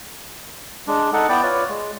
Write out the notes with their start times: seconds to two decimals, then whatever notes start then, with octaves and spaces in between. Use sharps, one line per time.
0.88 G#3 D4
1.13 D#4 A4 F#5
1.29 B3 E4 D5 G5
1.43 F4 B4 C#5 D5
1.69 G#3